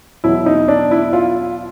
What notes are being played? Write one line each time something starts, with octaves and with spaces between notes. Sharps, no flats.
E2 B2 F#3 E4
D#4
D4
E4
F4